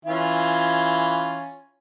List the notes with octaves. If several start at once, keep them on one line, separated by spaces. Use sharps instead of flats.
E3 C#4 F4